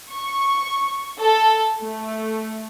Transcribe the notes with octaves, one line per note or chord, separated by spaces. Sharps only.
C#6
A4
A3